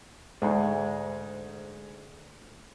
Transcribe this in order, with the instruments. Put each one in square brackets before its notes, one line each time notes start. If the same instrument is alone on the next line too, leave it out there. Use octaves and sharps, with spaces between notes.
[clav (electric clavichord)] D2 [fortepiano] G#2 G#3 D#4